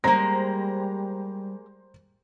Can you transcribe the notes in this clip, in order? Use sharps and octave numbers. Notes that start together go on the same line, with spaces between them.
G3 G#3 A#3 C5 A#5 A#6